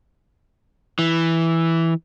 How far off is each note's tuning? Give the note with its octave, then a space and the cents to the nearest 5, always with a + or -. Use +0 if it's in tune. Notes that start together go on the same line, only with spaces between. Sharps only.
E3 +0